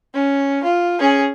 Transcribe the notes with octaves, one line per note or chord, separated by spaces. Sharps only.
C#4
F4
C#4 G#4